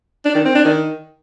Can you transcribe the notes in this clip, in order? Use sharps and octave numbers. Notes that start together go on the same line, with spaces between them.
D4
D#3
C4
D4
D#3